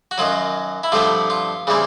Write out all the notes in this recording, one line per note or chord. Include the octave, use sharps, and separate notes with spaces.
F#4
F#2 D#3 F#3 F4
E4
G2 D3 F3 A3 C4 F4
F4
C#3 E3 G3 C4